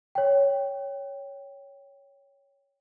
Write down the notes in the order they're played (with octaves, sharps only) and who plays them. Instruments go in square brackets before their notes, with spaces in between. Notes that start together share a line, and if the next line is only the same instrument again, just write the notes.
[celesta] C#5 G5